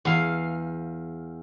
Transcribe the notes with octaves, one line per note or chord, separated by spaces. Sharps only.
E2 F5